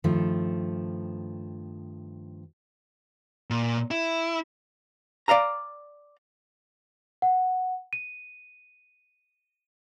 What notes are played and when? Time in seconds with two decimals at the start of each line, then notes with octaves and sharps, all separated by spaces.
0.04 G2 D#3 F3 A3
3.50 A#2
3.91 E4
5.28 D5 D#5 F5 A#5
7.22 F#5
7.93 D#7